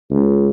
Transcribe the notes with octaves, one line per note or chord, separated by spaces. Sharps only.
C#2